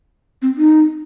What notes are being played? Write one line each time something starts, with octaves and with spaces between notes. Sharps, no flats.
C4
D#4